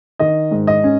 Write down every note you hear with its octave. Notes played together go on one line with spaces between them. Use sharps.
D#3 D#5
G#2
D#5
C#4